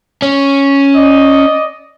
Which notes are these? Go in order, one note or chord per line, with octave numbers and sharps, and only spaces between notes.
C#4
D5 D#5